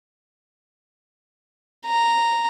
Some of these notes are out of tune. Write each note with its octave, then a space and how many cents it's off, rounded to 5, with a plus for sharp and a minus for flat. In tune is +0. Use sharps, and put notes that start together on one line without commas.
A#5 -5